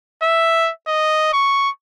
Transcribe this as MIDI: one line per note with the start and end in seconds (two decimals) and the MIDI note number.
0.23 0.71 76
0.88 1.29 75
1.33 1.70 85